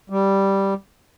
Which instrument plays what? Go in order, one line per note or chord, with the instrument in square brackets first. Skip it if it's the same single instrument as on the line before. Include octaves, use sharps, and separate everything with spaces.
[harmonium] G3